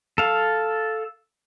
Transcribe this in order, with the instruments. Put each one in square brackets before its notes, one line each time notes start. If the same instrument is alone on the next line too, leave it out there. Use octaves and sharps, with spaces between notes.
[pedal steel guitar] A4 F5